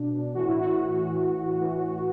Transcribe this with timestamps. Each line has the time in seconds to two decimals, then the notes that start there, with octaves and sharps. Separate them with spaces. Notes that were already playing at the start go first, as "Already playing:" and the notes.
Already playing: B2 D4
0.34 A2 E3 F#4
0.47 E4
0.61 F#4
0.98 A2 E3
1.60 A2 E3